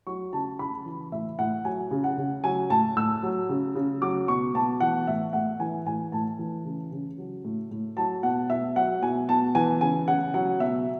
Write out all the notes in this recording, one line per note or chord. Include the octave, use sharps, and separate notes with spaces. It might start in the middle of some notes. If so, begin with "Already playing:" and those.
F#3 C#6
C#3 A5
C#3 B5
E3
A2 E5
A2 F#5
F#3 G#5
C#3
F#5
C#3
F#3 G#5
A2 A5
A2 E6
F#3
C#3
C#3
F#3 D6
B2 C#6
B2 A5
E3 F#5
A2 E5
A2 F#5
E3 G#5
A2 G#5
A2 A5
E3
C#3
C#3
F#3
A2
A2
F#3 A5
B2 F#5
B2 E5
F#3 F#5
B2 G#5
B2 A5
E3 G#5
C#3 G#5
C#3 F#5
F#3 F#5
B2 E5